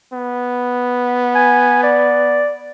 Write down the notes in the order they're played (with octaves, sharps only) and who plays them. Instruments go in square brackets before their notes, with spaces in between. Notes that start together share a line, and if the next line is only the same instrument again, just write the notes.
[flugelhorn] B3
[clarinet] G#5
D5